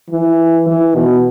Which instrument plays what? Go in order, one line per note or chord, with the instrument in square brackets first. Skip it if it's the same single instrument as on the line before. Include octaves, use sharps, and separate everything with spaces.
[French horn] E3
E3
B2